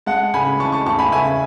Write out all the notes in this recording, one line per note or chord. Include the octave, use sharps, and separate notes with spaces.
G#3 F#5 A5
C#3 G#5 B5
E3 A5 C#6
A5 C#6
E2 A5 C#6
G#5 B5
C#3 E5 G#5